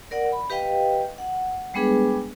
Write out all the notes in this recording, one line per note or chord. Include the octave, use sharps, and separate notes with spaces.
A#4 D5 F#5
B5
G4 B4 D#5 F5 G5
F#5
G3 G#3 B3 D4 G#4 B4